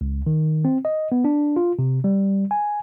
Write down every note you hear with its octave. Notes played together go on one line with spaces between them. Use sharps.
C#2
D#3
C4
D#5
B3
D4
F4
C3
G3
G#5